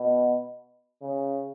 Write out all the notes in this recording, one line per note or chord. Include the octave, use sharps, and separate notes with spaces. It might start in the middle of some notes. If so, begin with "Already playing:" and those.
Already playing: B2
C#3